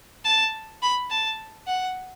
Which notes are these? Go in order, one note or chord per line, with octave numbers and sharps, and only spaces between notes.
A5
B5
A5
F#5